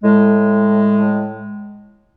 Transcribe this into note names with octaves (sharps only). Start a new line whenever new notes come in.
A2 G#3